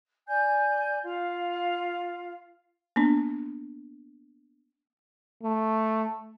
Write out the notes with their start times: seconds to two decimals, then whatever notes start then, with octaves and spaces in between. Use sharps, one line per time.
0.27 D5 G#5 G6
1.04 F4 F5
2.96 A#3 B3 D4
5.43 A3